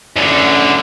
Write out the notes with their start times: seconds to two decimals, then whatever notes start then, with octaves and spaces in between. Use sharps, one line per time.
0.16 F#2 D3